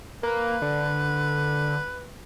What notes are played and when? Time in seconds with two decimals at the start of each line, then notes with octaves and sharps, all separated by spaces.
0.23 A#3 B4
0.62 D3